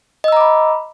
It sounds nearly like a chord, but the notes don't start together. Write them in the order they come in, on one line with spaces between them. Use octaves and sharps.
D#5 E6 A#5 D6 B5